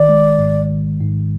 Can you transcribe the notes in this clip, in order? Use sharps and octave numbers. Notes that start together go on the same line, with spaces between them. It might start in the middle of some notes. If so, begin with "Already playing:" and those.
Already playing: G#1 D#3 D5
G#3
G#2
G#1
G#2